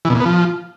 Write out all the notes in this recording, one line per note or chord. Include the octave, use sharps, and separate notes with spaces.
E3
B2
A#2
B3
F3